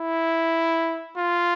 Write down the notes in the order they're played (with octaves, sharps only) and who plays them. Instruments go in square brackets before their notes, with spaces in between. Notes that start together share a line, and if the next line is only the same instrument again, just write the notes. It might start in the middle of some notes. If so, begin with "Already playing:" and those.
Already playing: [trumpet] E4
F4